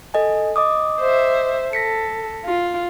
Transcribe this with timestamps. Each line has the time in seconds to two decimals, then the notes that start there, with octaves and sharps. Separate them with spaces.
0.14 A4 D#5 G#5
0.56 D#5 D6 D#6
1.00 C5 E5
1.73 A4 A#6 B6 C#7
2.45 F4